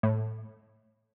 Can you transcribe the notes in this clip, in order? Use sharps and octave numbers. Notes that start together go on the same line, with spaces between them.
A2